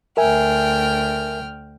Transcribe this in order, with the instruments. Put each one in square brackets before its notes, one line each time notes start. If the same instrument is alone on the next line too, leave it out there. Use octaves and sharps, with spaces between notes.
[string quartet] D2 G5 F6 [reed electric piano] A#4 E5 G#5